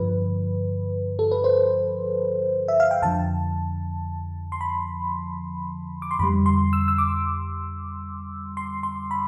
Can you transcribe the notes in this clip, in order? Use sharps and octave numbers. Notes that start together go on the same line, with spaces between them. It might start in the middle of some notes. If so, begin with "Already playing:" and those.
Already playing: G2 D3 F3 B4
A4
B4
C5
E5
F5
G5
F2 D3 F3 A5
C6
B5
D6
C6
F2 D3 G3 B5
C6
E6
E6
D6
C6
C6
B5